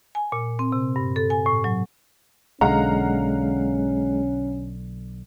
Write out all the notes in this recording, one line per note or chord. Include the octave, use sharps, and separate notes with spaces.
G#5
A#2
C4
C3
G2
A4
G#5
A2
F#3
B1 D3 G#3 C#4 F5 F#5 A#5